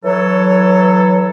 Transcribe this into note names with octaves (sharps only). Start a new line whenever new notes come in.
E3 F#3 A4 C#5